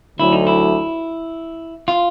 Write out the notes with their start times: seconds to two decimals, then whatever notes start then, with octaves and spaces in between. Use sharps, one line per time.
0.19 D2 D3 F#3 E4
0.32 D#4
0.47 E4
1.88 F4